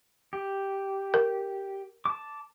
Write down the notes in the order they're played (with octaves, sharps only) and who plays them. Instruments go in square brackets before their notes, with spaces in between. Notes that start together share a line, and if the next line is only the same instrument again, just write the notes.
[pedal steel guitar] G4
[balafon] A#4
[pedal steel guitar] A5 D6